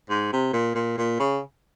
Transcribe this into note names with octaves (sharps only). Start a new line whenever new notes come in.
G#2
C3
A#2
A#2
A#2
C#3